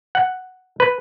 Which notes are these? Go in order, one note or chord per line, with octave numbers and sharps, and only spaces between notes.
F#5
B4